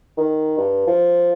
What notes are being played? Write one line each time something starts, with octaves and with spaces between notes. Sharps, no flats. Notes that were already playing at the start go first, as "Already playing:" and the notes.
D#3
G2
F3